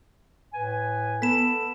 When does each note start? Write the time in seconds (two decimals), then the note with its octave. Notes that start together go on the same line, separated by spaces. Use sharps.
0.53 A2 B4 G#5
1.22 B3 A4 B6 E7